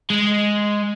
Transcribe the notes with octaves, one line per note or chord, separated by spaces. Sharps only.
G#3